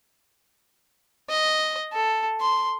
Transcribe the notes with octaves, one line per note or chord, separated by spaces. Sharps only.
D#5
A4
C6